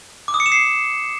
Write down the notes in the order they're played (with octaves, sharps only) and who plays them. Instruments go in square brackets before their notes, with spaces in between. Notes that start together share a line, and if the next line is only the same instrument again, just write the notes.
[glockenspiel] D6
D#6
C#7
E7
C7